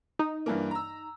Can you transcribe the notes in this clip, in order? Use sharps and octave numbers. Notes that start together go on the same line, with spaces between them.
D#4
G2 E3 A#3
A#5 E6